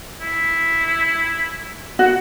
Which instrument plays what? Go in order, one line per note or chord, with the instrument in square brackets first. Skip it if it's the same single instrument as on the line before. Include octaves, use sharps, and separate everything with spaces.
[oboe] E4
[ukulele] F#4